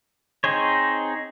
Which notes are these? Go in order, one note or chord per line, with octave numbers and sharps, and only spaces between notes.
C4 D#4 G#4 C5 C#5